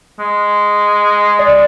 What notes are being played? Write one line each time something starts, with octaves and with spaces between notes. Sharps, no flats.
G#3
D5